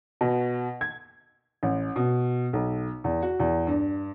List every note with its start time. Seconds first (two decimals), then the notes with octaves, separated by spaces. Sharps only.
0.21 B2
0.81 G#6
1.63 A1
1.96 B2
2.53 B1
3.04 E2
3.22 F#4
3.40 E2
3.67 G2